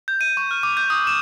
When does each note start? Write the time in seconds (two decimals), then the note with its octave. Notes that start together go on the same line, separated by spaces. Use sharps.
0.08 G6
0.21 D#7
0.37 C#6
0.51 F6
0.63 D6
0.77 G6
0.90 D#6
1.07 E7